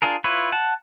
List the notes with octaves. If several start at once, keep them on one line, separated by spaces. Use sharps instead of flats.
D4 F4 G#4 A#4
E4 F4 B4 C#5
F#5 A5